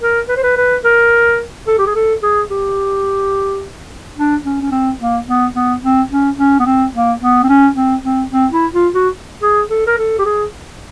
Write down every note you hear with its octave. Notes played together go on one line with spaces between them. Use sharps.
A#4
B4
C5
B4
B4
A#4
A4
G4
G#4
A4
G#4
G4
D4
C#4
C#4
C4
A#3
B3
B3
C4
C#4
C#4
B3
C4
A#3
B3
C4
C#4
C4
C4
C4
E4
F4
F#4
G#4
A4
A#4
A4
G4
G#4